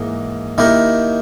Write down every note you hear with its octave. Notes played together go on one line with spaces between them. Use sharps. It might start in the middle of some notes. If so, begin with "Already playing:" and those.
Already playing: G#2 E3 A#3
D#3 A#3 E4 G4 A#4